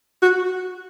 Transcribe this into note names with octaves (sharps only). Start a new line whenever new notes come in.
F#4